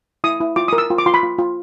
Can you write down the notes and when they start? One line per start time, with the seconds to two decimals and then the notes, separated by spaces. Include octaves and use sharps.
0.24 E4 D#6
0.41 E4
0.56 F4 D6
0.68 A#4 D#6
0.78 E6
0.90 F4
0.98 D6
1.06 F4 C6
1.14 B5
1.23 F4
1.38 F4